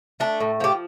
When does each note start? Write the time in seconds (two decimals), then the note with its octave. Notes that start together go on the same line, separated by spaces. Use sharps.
0.20 A3 D4
0.40 A2
0.60 F3 G4